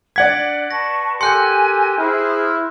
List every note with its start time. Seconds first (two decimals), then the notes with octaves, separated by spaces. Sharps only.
0.16 D4 D5 F#5 G#6 B6
0.71 B4 A5 C#6 A#6
1.21 G4 A4 A#4 G#5 C6 F#6 G6 C#7
1.98 E4 G#4 C5 F6